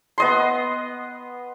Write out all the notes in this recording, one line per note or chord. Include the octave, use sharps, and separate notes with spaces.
B3 D#5 C6